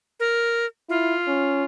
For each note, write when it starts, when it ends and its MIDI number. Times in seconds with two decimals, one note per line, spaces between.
0.20 0.66 70
0.90 1.14 64
0.90 1.65 65
1.28 1.64 61